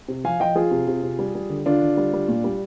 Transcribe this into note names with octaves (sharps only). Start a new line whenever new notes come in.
C3
F3 F5 G#5
F3 D#5 G5
F3 F4 G#4
C3
C3
C3
G3
G3
D3
D3 D4 F4
D3
G3
G3
A#2
G3